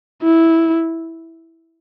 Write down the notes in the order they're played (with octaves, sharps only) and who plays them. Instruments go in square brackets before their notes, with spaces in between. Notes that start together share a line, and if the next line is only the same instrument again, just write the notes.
[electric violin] E4